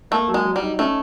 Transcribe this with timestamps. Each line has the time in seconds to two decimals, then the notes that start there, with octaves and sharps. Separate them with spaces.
0.11 A3 A#3
0.28 F#3
0.34 G#3
0.45 F#3
0.56 G3
0.62 D#4
0.79 A3 C#4